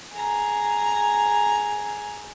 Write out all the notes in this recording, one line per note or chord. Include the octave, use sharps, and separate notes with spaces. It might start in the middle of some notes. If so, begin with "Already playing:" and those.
G#4 A#5